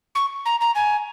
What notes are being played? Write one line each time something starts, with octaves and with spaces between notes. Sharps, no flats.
C#6
A#5
A#5
G#5